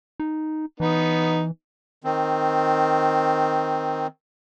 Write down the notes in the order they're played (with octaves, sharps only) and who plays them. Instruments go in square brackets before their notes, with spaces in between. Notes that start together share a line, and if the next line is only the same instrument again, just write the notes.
[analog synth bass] D#4
[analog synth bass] E3 [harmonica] B3 D#4
[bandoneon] D#3 C4